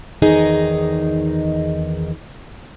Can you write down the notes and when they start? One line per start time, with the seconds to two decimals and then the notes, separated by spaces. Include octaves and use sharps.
0.22 E2 D#3 D#4 G#4 D#5